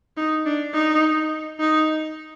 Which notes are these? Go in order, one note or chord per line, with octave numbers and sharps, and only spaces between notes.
D#4
D4
D#4
D#4